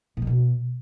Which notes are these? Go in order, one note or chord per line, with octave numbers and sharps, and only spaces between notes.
A2
D#3
B2